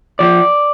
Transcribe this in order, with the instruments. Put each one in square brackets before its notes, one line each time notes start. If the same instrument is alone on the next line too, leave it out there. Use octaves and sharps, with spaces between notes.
[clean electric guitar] F3 D5